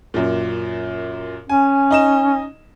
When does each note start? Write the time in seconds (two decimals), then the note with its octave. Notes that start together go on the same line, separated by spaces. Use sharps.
0.14 F#2 A#2
1.49 C#4 G#5
1.91 D#4 D#5 E7